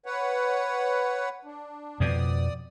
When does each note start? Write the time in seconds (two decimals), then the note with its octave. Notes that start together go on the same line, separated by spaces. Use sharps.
0.06 B4 C#5 F#5
1.45 D4
2.00 F2 B2 D5 D#6